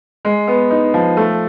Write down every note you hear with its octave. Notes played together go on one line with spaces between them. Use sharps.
G#3
B3
D#4
F3
A3